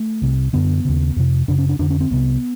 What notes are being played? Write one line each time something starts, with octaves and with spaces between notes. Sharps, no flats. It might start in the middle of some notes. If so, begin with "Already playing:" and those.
Already playing: A3
C2 C3
F#2 D3 B3
D#2 C#3
F2 C3
F#2 C#3 D4
C#4
D4
F2 D3 D4
C#4
C4
C2 C3 B3